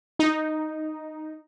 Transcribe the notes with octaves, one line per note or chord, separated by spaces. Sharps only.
D#4